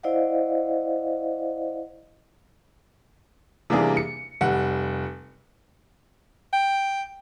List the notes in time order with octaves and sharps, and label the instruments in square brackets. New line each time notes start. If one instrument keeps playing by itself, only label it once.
[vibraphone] E4 C5 D5 D#5 F5 F#5
[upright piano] C3 E3 G3 A#3 D4 G#4
C#7
F1 G3 F#5
[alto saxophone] G5